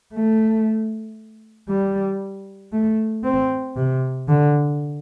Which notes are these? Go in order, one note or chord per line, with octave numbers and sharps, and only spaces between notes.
A3
G3
A3
C4
C3
D3